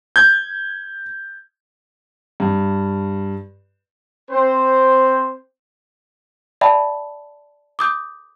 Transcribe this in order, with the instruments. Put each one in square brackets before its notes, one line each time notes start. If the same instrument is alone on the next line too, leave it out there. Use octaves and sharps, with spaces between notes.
[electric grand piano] G6 G#6
[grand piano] G2
[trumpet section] C4 C5
[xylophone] D5 E5 G5 A5 B5
D6 D#6 G6